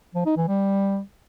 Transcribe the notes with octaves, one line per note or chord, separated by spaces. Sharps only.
F3
D#4
E3
G3